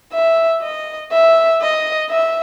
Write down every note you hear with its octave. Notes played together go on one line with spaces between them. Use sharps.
E5
D#5
E5
D#5
E5